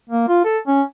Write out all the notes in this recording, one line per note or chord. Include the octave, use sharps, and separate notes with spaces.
A#3
F4
A4
C#4